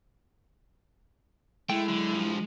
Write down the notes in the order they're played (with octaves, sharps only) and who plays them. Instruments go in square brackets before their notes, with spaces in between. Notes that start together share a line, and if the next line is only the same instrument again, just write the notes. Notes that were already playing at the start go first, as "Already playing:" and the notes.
[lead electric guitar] G#3 [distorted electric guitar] A3 [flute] E4 [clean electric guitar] G5
[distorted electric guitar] D3 [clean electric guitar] F#3
[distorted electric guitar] G2 F3